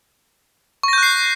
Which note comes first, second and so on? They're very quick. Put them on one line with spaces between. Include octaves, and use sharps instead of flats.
C#6 A#6 G6 F#6 C7